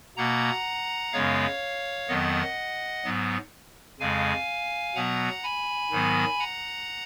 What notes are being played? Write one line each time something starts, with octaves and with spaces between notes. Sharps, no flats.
B2 A#3 F#5 A#5
F#2 C#3 G#3 B3 C#5 F5
F2 D#3 F#3 B3 D#5 F#5
G#2 F#3 B3
F2 C#3 G#3 F5 G#5
B2 F#3 B3 F#5 A#5
G#5 B5
G#2 D#3 F#3 B3
F#5 A#5